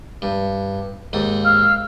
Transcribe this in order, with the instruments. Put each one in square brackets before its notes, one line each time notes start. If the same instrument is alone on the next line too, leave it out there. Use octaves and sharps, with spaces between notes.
[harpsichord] G2
D#2 G#2 D#6
[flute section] F5 E6 F6